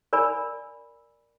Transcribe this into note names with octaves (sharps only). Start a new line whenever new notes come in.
A#4 D5 G#5 B5